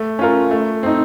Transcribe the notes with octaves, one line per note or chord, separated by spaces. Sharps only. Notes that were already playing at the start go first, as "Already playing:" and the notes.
Already playing: A3
C#4 F4 A#4
A3
C4 D#4